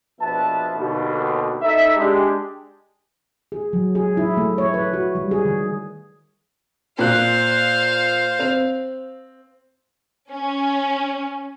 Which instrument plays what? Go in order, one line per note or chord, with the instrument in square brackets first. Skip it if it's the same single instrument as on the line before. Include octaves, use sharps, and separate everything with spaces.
[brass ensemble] A#1 B2 F3 B4 E5 A5
D#2 B2 D3
D#4 E4 A4 D#5 E5
G#3 D4 G4
[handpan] G#4
F#3
G#4
E4
A3
C#5
B4
F#4
G3
G#4
D#3
[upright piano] A#2 F#6 [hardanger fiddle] C5 F5
[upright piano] C4 F7
[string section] C#4